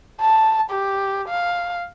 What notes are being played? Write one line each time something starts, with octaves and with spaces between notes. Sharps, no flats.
A5
G4
F5